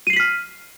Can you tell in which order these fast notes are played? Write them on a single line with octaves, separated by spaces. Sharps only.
D#7 C7 F#7 B6 F6